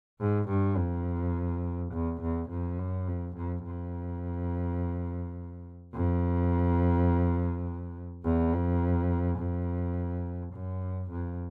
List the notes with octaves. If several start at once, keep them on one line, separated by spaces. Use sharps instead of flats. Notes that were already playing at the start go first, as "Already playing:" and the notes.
G#2
G2
F2
E2
E2
F2
F#2
F2
F2
F2
F2
E2
F2
F2
F#2
F2